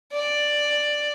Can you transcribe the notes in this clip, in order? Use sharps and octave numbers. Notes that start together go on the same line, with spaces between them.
D5